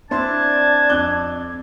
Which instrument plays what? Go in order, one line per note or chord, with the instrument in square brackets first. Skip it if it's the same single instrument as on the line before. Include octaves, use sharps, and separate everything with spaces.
[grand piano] C4 E4 C6 [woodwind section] D4 A5 [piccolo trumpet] G#6
[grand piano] F2 F#6 G7 [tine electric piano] C4 D6